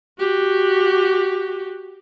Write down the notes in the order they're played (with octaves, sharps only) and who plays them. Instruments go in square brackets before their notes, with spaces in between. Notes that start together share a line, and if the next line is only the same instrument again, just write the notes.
[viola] F#4 G4